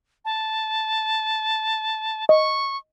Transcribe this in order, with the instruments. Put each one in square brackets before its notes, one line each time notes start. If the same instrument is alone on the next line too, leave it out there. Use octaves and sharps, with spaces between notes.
[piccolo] A5
[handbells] D#5 [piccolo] C#6